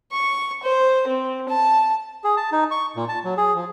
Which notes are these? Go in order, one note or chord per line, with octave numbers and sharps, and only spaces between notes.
C#6
C5
C4
A5
G#4
A5
D#4
C#6
A#2
A5
F#3
G#4
F3